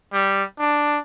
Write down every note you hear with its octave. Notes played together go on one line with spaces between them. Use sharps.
G3
D4